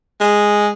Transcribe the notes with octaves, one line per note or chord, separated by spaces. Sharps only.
G#3